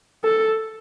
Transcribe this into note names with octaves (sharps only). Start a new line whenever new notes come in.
A4